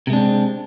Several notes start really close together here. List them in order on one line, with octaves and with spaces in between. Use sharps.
C3 G#3 D4 C4